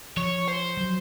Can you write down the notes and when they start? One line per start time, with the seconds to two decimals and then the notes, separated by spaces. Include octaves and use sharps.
0.17 F3 C#5
0.48 C5
0.77 F#3